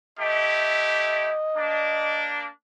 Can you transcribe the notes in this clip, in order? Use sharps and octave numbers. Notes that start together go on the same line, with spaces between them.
A3 E4 G4 D#5
A#3 D4